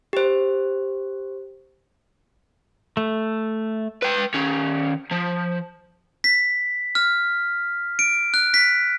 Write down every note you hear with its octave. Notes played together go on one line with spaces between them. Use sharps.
G4 C5
A3
B4 G5
D#3 C#4
F3
B6
F6
D7
F#6
B6